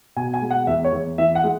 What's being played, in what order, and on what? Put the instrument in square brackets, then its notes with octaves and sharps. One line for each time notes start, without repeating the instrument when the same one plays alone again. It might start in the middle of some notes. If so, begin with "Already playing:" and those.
[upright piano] B2 G#5
G#5
G#3
F#5
E2 E5
C#5
E2
E3 E5
F#5
G#3